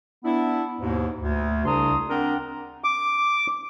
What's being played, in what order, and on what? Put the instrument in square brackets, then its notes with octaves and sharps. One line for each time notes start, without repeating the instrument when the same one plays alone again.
[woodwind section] B3 D4 E4
D#2 G#2 B2
D2
C2 C#3 D4 A#5 C6 D#6
C4 D4 A#4 F#5 G5 A#5
[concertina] D6